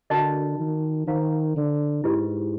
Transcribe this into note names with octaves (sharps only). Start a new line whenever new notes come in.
D3 F#4 A#4 D#5 F#5 A5
D#3
D#3 C5 F5 A#5
D3
G#2 E4 G4 B4 D#5